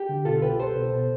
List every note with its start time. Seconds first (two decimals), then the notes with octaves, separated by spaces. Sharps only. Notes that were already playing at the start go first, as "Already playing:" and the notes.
Already playing: G4
0.09 D3
0.25 B2 F4 A4
0.42 C2 G4 B4
0.59 C2 A4 C5
0.76 B2
0.93 B2